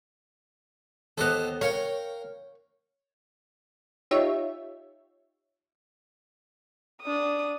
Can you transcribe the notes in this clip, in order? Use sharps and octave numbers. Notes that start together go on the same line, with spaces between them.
D#2 B3 A4 C5 D#5
A#4 C#5 F5 G5
D#4 F4 G4 C#5 E5
D4 D#6